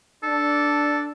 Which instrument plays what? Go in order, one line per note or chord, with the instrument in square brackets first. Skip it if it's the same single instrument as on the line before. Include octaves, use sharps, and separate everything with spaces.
[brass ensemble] D4 [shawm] A4